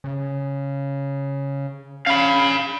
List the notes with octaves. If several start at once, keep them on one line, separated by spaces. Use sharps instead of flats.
C#3
C#4 F5 B5